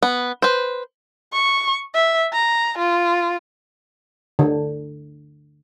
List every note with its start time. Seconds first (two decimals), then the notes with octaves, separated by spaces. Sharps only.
0.03 B3
0.42 B4 C5
1.33 C#6
1.94 E5
2.33 A#5
2.78 F4
4.39 D3